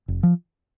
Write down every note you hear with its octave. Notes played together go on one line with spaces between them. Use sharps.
F1
F3